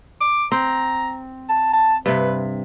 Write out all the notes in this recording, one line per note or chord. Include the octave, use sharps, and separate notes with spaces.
D6
C4 A#5
A5
A5
G2 C3 B4